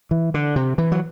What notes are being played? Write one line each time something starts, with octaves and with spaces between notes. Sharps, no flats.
E3
D3
C3
E3
F#3